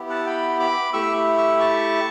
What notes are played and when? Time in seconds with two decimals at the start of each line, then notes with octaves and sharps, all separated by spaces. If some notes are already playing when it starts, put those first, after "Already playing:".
Already playing: B3 E4 G4
0.10 F#5 A5
0.26 G5 B5
0.59 B5 D6
0.93 A3 E4 G4 C#6 E6
1.38 C#6 E6
1.60 A5 C#6